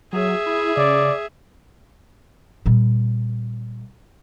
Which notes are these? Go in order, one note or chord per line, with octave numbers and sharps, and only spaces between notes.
F#3 G#4 E5
E4
C#3 D5
A#2 G3